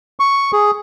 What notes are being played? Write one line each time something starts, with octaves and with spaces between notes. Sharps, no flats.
C#6
G#4